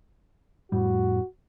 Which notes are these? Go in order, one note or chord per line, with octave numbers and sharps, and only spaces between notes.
F2 A2 G3 F#4